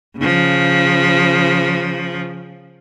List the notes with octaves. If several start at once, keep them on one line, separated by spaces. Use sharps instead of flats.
C#3 F3